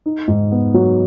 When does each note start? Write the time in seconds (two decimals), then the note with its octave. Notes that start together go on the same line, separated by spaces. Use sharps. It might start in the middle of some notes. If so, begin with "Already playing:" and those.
0.06 D#4
0.28 G#2
0.52 B3
0.74 F#3